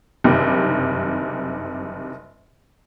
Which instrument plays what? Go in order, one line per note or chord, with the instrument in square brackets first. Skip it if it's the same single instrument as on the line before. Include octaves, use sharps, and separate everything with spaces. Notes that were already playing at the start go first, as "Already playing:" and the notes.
[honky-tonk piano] F#1 G2 C3 D#3 G4